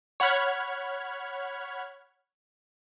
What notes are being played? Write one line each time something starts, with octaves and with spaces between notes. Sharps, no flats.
C#5 F#5 B5 F6 G#6